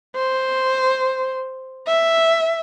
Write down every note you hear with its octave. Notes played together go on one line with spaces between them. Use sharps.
C5
E5